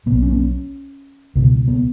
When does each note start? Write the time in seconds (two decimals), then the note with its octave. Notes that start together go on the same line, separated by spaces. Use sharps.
0.06 B1 B2 B3
0.23 C#4
0.33 B3
0.39 C#4
1.35 C#2 B2
1.68 B3